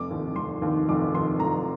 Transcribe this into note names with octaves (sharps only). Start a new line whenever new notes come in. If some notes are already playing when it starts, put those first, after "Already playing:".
Already playing: F1 D6
D#2 D#3
F1 C6
D#2
D#3
F1 D6
D#2 D#3 C6
F1 A#5